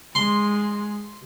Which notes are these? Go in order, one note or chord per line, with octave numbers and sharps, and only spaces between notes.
G#3 C6